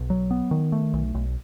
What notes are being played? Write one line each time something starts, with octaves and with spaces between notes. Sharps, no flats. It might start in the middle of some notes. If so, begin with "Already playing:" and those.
Already playing: B1
F#3
B3
D#3
A3
B1
B1